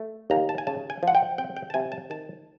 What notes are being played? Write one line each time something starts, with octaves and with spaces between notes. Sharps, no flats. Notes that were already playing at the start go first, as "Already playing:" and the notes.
Already playing: A3
D#2 A#5
A5
G#5
C#3 A5
G#5
F3 F#5
G5
C4 G5
G5
A5
C3 G#5
A5
D#3 A5